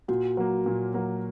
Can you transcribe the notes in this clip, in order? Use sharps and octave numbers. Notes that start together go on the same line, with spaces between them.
A#2 F#4
F#3 A#3
A#2
F#3 A#3